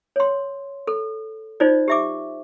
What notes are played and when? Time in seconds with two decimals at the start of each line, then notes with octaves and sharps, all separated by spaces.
0.16 C#5 C6
0.87 A4
1.60 D#4 F4 C5 D5
1.88 G4 E5 D6